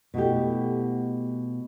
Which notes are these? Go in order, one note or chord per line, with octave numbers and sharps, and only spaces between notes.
B2 A3 E4 G4